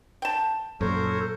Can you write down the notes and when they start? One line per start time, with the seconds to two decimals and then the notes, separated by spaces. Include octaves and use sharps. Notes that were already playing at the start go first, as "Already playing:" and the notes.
0.22 G5 A5
0.81 F#2 A#2 A4 A#4 C5 C#5